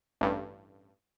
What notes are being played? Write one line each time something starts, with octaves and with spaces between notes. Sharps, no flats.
A1 G2